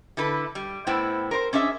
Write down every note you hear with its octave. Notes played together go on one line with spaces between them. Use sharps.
D3 E4 A4 B4
G3
A2 B3 E4 C5 G5
A#4 C5
C#4 D4 G#4 E5